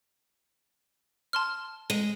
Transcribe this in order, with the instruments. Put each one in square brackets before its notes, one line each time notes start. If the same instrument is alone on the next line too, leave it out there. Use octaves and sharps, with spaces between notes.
[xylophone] A5 C6 F6
[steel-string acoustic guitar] G#3 [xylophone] D#7